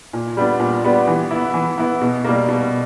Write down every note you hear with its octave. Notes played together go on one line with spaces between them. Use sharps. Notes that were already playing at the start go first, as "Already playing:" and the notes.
A#2
G3 B3 D4
A#2
G3 B3 D4
E3
B3 E4
E3
B3 E4
B2
G3 A#3
B2